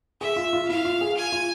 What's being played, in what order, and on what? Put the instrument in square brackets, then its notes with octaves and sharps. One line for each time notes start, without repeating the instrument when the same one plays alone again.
[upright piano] G#4 [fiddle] E5
[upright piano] F4
F4
[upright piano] E4 [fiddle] F5
[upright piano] F4
G#4
[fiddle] G#5
[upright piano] F4